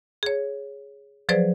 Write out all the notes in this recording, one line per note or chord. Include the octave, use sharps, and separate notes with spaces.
G#4 C#5
F3 F#3 G#4 B4 C5 D5